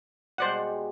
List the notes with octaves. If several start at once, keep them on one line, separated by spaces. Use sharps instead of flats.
B2 G3 G#3 C5 D5 F#5